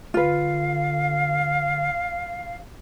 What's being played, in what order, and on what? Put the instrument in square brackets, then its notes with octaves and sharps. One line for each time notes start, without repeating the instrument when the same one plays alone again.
[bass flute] D3 [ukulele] F4 B4 [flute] F5